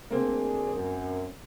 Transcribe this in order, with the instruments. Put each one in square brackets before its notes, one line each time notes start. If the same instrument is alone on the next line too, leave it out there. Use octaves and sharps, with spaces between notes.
[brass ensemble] D2 D4 G#4 [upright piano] A#3 C4
[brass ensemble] F#2